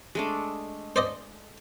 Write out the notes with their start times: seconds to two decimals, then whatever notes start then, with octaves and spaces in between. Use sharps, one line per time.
0.15 G#3 A3 D4
0.96 C5 D5 D#5